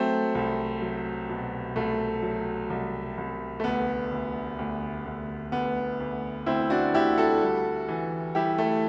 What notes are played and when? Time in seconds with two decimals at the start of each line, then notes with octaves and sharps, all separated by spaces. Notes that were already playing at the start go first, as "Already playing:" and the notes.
Already playing: F#3 A3 C4
0.35 C2
0.82 F#3
1.29 B2
1.76 C2 A3
2.23 F#3
2.70 C2
3.18 C2
3.60 A3
3.64 D2 B3
4.12 D2
4.59 D2
5.05 D2
5.52 D2 B3
6.00 D2
6.46 D2 C4 E4
6.70 D4 F#4
6.94 D2 E4 G4
7.18 F#4 A4
7.42 G3
7.88 E3
8.35 G3 E4 G4
8.58 A3